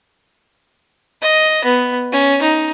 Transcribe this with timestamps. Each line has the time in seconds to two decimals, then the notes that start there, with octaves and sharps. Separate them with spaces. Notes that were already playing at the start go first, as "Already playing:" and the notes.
1.22 D#5
1.64 B3
2.12 C#4
2.42 D#4